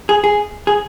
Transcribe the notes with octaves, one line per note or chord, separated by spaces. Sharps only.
G#4
G#4
G#4